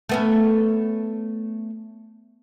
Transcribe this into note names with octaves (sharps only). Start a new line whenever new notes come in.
A3 B3 C#4